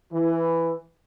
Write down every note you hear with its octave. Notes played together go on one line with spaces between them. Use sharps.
E3